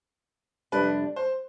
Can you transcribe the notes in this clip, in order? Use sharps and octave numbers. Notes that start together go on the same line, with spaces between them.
F2 C3 G3 D4 B4
C5